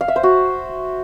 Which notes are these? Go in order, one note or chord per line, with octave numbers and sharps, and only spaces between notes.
F5
E5
C5
F#4